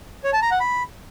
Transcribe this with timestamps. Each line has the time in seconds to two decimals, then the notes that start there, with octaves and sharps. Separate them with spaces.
0.24 C#5
0.33 A5
0.42 A#5
0.51 F#5
0.60 B5